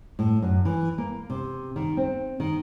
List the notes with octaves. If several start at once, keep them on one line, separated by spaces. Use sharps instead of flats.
A2
F#2
E3
A#3
C3
D#3
C4
D#3